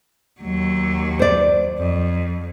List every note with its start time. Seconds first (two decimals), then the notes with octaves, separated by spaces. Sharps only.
0.40 D#2 F#3
1.19 C5 D5
1.78 F2